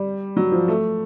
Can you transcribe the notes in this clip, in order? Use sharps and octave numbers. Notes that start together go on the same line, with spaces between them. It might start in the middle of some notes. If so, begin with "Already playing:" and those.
Already playing: G3
F#3
F3
A3